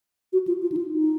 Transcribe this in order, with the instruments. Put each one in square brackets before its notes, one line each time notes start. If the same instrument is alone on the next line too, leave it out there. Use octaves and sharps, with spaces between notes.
[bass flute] F#4
F4
F4
D#4
F4
D#4